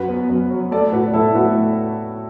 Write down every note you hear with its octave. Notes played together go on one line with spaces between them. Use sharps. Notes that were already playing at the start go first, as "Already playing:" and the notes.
Already playing: F#2 F#4 B4
B3
F#2
F#3
A3 A4 D5
A2 F#4 B4
A2 E4 A4
A3 F#4 B4